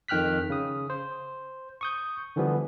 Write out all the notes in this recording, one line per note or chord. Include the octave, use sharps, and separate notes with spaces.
F2 D#3 G5 F6 F#6 B6
C#3 D#6
C5
C#6 D#6 G6
D3 E3 F3 G3 B3